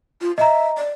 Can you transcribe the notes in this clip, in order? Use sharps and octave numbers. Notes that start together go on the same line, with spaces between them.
F4
D#5 E5 A#5
D5